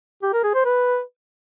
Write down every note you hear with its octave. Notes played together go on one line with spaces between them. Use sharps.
G4
A#4
G#4
C5
B4